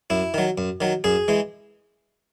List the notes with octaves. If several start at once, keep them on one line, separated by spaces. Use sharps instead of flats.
F#2 E4
D#3 F#3
F#2
D#3 F#3
F#2 G#4
E3 G#3